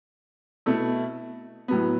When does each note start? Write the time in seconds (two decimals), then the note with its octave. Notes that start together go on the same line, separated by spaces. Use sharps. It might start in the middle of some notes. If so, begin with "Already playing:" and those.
0.66 B2 A3 E4
1.68 A2 F#3 B3